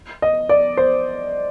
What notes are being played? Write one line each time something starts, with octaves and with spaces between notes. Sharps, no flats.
D#5
D5
C5